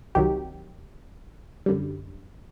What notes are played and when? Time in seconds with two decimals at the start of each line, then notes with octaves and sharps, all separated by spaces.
0.15 C2 C3 D#3 F#3 G4
1.66 F#2 D3 G3